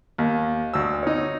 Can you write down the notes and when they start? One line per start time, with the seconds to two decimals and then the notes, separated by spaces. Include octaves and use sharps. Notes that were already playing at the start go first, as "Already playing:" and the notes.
0.18 D#2
0.74 D2 E6
1.03 D#4 C#5